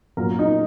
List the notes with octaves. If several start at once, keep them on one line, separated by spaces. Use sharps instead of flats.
A#2 F#3 A#3 C#4 A#4
D#4